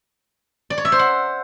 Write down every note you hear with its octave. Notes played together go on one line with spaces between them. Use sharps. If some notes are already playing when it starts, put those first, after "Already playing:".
D5
C#5
E5
C5
F#5